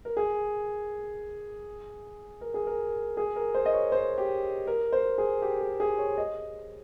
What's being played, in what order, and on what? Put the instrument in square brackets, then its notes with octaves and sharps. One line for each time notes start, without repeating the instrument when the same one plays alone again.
[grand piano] A#4
G#4
A#4
G#4
A#4
G#4
A#4
C5
D#5
C#5
C5
G4
A#4
C5
G#4
G4
G#4
G#4
C#5
D#5